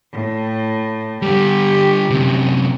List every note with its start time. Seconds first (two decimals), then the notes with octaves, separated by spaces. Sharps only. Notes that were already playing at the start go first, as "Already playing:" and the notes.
0.12 A2
1.22 D3 G3 G4
2.10 F#2 C3